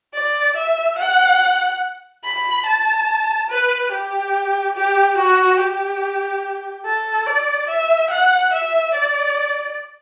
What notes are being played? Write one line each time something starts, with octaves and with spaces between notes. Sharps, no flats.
D5
E5
F#5
B5
A5
B4
G4
G4
F#4
G4
A4
D5
E5
F#5
E5
D5